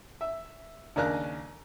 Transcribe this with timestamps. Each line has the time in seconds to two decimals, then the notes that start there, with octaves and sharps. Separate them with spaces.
0.21 E5
0.96 D#2 C#3 D4 A#4 F6 F#6